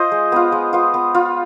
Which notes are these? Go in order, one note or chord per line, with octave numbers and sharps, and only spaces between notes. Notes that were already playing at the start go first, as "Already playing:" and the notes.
Already playing: F4 C5 D#5
G#3
B3 F4
G#3
B3 F4
B3
F4